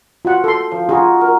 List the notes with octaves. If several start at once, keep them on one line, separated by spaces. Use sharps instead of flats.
F4 F#4 F#5
A4 C6
F3
D#4 F4 F#4 G#4
A#4